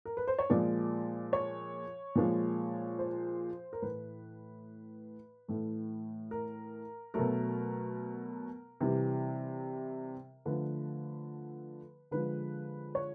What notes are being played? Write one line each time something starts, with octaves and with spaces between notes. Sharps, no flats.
A#4
B4
C5
C#5
A#2 F3 G#3 D5
C#5
A#2 F3 G#3
C5
A#4
A2 E3 A3 B4
A2 E3 A3
A#4
B2 F#3 A3 A#4
C3 E3 G3
D3 F3 A3 B4
D3 F3 G#3 B4
C#5